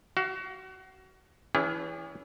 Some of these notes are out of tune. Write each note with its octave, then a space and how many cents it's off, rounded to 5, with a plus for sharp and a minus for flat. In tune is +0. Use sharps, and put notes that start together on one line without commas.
F#4 +30 F5 +0
E3 +0 C#4 +35 G#4 -40